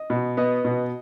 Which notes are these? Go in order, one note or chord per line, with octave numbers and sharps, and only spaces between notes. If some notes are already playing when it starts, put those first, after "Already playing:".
Already playing: D#5
B2
B3 D#5
B2